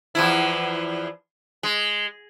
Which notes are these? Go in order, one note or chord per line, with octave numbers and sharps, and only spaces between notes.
E2 F3 E4
G#3